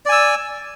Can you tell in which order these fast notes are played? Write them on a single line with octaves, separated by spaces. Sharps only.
D5 G#5 E6